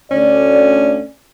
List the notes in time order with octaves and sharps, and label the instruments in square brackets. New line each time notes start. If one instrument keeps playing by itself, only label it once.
[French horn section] D2 D5 [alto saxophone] C#4